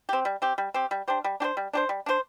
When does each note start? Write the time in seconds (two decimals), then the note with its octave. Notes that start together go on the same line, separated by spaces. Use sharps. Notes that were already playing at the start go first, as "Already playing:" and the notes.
0.09 C4 G4
0.25 G3
0.42 C4 G4
0.58 G3
0.74 C4 G4
0.91 G3
1.08 D4 G4 C5
1.24 G3
1.40 D4 G4 C5
1.57 G3
1.73 D4 G4 C5
1.89 G3
2.06 D4 G4 C5